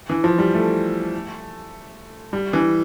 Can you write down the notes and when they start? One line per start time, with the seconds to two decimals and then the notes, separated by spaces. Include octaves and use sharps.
0.10 E3
0.24 F3
0.38 G3
0.54 A3
2.33 G3
2.53 E3